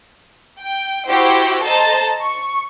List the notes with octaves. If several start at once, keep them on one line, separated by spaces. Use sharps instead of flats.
G5
E4 F#4 G4 C5
A4 C5 D#5 A5 A#5
C#6